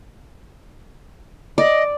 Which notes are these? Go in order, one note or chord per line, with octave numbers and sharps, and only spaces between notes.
D5 D#5